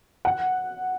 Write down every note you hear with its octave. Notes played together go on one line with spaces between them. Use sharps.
F#5